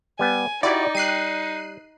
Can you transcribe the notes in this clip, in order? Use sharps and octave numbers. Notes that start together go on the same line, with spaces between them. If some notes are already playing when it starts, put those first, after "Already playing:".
G3 B3 G#5
D#4 E4 F#4 G4 D5
G3 F#6 C7 D#7